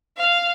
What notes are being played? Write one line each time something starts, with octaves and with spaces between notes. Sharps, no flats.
F5